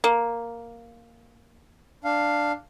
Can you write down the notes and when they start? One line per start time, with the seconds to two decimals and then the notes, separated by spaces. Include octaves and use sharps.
0.04 A#3
2.04 D4 F5